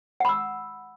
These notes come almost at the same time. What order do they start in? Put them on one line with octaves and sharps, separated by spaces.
F#5 B5 E6